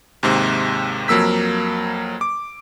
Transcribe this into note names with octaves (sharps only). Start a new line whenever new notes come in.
D#2 G#2 C3
F2 F#3 A#3 E6 B6
D6